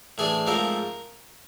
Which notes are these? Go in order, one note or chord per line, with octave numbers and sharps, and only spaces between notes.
A2 E3 A3 D4 G#4
G#2 F3 A3 C4 A#4